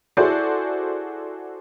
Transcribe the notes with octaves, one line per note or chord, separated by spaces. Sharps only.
E4 F#4 G#4 A4 C5 D5